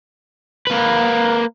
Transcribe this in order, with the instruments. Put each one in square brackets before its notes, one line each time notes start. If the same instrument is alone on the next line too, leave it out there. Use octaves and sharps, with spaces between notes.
[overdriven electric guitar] A#3 B4